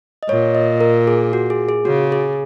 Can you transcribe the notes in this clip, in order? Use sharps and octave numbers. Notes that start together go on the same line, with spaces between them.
D#5
A#2 C#5
D#5
A#4
G#4
F#4
G#4
G#4
C#3 F#4
G#4